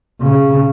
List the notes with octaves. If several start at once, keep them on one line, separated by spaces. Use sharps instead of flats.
C#3